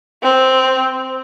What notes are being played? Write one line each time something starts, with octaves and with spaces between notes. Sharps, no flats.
C4